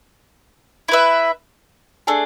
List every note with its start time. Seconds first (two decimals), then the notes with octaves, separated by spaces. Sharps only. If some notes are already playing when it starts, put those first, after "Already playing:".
0.88 E4 B4 E5
2.07 A3 D4 G#4